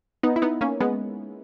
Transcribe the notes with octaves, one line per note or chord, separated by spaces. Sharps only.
B3 D#4
E4
B3 D#4
A#3 C#4
G#3 B3